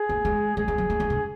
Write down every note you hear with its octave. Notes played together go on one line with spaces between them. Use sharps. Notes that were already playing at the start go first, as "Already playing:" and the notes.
Already playing: G#4
A3
G#3
G#3 G#4
G#3
F#3
A3
G#3
C#3